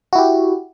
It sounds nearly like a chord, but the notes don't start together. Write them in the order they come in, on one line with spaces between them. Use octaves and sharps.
F#4 E4 G4